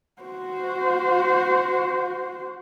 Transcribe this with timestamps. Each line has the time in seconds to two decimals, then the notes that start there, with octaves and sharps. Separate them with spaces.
0.22 F#4 C5